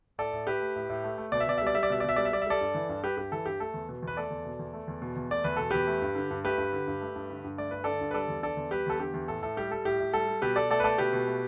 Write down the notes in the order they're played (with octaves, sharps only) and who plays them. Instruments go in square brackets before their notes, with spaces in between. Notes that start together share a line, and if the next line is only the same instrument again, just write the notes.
[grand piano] A2 A4 D5
A2
A3 G4 B4
A3
A2
A2
A3
A3
B2 D5
E5
B2 D5
E5
G3
D5
G3 E5
D5
B2 E5
D5
B2 E5
G3 D5
E5
G3 D5
E5
G3 A4 D5
G2
E3
G2
G3 G4 B4
G2 G4
E3 A4
G2 G4
A3 A4
E2
B2
E2 B4
A3 A4 D5
E2
B2
E2
A3
E2
B2
E2
A3 D5
E2 B4
B2 A4
E2 G4 B4
A3
G2
D3
G2
A3 G4 B4
G2
D3
G2
A3
G2
D3
G2
A3 D5
G2 B4
D3 A4 D5
G2
B4
G3 A4 D5
E2
D3 A4 D5
E2
G3 G4 B4
E2 A4
D3 G4
E2
A2 A4
A2 A4
G3 G4
G3 A4
A2 G4
A2
G3 A4
G3
B2 G4 B4
B2 A4 D5
A3 A4 D5
B4
A3 A4 D5
B2 G4 B4
B2
A3